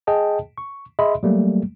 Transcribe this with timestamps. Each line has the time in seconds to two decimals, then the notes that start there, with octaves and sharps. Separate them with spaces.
0.07 G#4 D#5 G5 A5
0.58 C#6
0.99 G#4 D#5 E5 B5 C6
1.23 F#3 G3 A3 A#3